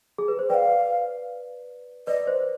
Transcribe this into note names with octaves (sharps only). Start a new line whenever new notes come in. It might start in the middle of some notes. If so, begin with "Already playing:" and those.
G#4
B4
C5
B4 D5 F5 G5
B4 D5 D#5
C5